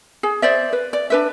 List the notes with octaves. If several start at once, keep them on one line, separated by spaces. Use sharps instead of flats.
G#4
C5 D5 E5
B4
D5
D4 B4 E5